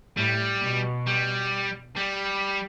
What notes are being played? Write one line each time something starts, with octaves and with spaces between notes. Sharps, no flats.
A2 G3
B2
G3
G3